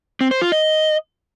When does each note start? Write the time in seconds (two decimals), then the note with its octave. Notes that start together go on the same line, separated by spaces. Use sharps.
0.21 C4
0.31 C5
0.42 F4
0.52 D#5